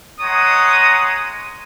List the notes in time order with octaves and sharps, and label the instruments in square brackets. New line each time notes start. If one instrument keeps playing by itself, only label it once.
[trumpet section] G#3 C#5 F#5 A#5 D#6